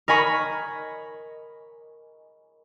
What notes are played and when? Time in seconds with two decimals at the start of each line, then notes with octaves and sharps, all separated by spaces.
0.08 A#4 D#5 G#5 B5 C#6